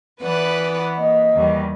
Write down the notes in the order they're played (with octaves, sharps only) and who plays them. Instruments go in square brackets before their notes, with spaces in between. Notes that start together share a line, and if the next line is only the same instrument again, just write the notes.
[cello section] E3 B3 [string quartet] B4 D5 F#5
[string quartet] A#3 [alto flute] D#5
[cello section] E2 D#3 G3